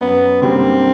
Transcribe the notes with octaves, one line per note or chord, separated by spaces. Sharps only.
F#2 B3
D3 G3 A#3 C4